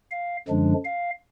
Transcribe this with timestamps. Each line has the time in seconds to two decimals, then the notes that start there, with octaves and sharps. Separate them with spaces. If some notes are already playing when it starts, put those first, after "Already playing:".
0.11 F5
0.48 F#2 D3 F3 G#3 D4
0.85 F5